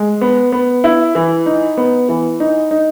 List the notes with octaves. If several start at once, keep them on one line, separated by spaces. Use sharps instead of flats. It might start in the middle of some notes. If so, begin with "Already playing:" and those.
Already playing: G#3
B3
B3
E4
E3
D#4
B3
E3
D#4
D#4